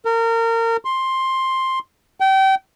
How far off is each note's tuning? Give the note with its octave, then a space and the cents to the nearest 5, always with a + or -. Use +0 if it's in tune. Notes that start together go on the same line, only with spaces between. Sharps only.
A#4 -30
C6 +10
G5 -30